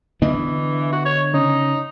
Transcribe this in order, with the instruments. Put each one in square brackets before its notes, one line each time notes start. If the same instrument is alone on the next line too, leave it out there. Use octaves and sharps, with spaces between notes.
[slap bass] D3 B3 D4 [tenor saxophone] E3 [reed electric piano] D#5
[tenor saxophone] F#4
C#5
[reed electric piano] C#3 C#4 C#5 [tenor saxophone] D#4